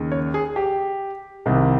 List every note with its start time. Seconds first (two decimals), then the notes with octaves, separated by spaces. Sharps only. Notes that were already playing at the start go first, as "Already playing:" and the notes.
Already playing: D#2 C#3
0.12 C#5
0.34 G#4
0.56 G4
1.46 C2 C3 D#3